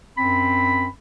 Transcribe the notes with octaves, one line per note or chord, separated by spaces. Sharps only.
F#2 C4 B5